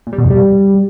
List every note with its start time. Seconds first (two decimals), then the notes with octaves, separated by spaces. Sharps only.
0.07 A#2
0.13 G3
0.18 B2
0.24 F2
0.30 G3